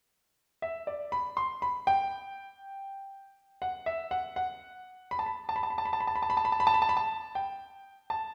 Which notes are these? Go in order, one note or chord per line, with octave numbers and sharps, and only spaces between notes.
E5
D5
B5
C6
B5
G5
F#5
E5
F#5
F#5
B5
A5
B5
A5
B5
A5
B5
A5
B5
A5
B5
A5
B5
A5
B5
A5
B5
A5
B5
A5
B5
A5
B5
A5
G5
A5